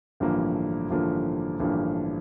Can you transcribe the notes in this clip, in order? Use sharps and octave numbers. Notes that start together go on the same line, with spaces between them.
A1 G2 D3 F3 A#3
A1 G2 D3 F3 A#3
A1 G2 D3 F3 A#3